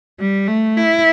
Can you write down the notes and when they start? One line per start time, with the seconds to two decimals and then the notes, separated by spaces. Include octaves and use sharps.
0.19 G3
0.48 A3
0.77 E4